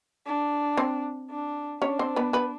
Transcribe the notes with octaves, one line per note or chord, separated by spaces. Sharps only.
D4
C4 C5
D4
C#4 D4 C#5
C4 C5
B3 B4
B3 B4